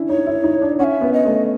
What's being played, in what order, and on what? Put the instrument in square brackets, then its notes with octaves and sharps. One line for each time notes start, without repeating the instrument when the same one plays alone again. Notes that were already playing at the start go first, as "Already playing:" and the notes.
Already playing: [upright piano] C#4 D4 E4
[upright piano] D#4 [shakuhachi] C#5
[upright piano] E4
D#4
D4
[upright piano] C#4 [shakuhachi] E5 F#5
[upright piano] B3
[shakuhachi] D#5
[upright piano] A3